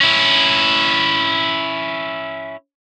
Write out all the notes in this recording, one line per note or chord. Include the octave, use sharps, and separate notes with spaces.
C#4 E4